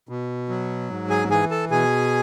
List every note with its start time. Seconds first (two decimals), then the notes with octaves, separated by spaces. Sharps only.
0.09 B2
0.49 F#3
0.90 G#2
1.10 G#4 G#5
1.30 E3 G#4 G#5
1.51 A4 A5
1.71 B2 G#4 G#5